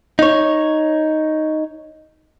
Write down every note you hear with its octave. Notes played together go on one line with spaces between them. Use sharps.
D#4 C#5